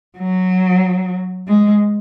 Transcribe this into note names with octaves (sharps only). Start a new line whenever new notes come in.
F#3
G#3